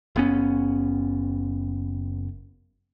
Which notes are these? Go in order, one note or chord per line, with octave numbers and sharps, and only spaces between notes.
F#1 B3 C#4